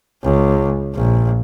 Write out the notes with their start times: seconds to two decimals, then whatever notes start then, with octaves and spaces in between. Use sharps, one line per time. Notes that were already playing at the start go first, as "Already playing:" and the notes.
0.23 C#2
0.95 A#1